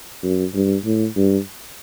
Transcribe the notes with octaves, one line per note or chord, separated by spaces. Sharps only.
F#2
G2
A2
G2